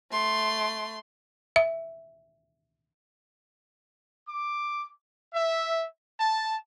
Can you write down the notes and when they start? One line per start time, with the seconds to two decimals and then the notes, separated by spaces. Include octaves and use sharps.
0.11 A3 C6
1.56 E5
4.27 D6
5.33 E5
6.19 A5